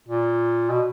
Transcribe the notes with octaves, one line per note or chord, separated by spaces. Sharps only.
A#2
B2